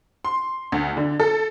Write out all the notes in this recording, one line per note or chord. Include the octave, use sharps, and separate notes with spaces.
C6
D2
D3
A4